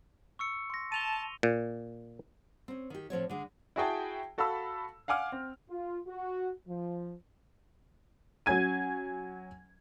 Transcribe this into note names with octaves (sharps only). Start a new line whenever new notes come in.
C#6 E6 C#7
C6 A#6
A5 D#7 F7 G7
A#2
C4 C#4
D#3 G4
A2 F3 C4 C#5
D3 G#3
E4 F#4 G#4 G5 A5
F#4 A4 F5 A5 B5 E6
F5 F#5 G#5 D6 F6
C4
F4
F#4
F3
F#3 C#4 G#5 G#6 D#7